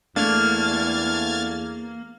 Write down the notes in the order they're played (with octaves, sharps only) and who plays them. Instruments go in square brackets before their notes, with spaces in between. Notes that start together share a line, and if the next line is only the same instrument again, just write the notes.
[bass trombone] E2 [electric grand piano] A3 D4 F5 [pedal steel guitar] A#3 [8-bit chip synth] F6 G#6 A6